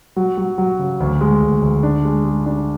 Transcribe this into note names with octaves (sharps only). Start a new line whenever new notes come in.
F#3
F#3
F#3
C#3
D2
G#3
D2
D2
D4
G#3
G#3
D4